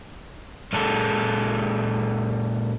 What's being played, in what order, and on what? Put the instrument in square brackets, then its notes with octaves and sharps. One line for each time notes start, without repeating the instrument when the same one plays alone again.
[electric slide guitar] A#2 G#3 C#4 A4